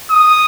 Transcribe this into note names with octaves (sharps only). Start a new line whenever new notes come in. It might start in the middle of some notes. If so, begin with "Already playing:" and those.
D#6